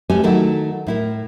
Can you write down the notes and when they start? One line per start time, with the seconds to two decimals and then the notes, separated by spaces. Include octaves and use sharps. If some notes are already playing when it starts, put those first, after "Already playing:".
0.10 A3 C#4 G4 B4 G#5
0.23 D#3 F#3 A3 D#4 E4
0.87 A2 E4 A#4